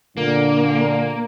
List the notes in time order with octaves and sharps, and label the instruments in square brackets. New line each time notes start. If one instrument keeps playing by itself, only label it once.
[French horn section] A#2 D3 [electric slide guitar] A#3